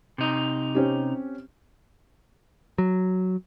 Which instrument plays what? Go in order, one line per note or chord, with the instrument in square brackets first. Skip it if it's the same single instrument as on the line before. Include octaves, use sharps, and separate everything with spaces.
[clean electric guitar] C3 D#4
[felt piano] C4 C#4 G4
[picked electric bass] F#3